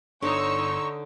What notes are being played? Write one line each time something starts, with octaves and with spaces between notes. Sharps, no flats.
G1 D3 D4 D#4 C#5 C6 C#6 E6